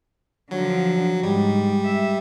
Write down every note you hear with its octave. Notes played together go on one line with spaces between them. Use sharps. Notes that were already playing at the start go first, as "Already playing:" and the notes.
D3 F3 F#3
G#2 G3
E5